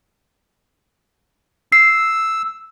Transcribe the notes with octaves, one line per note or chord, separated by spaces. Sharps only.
E6 C7